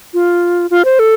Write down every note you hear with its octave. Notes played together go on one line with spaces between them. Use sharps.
F4
F4
C5
A4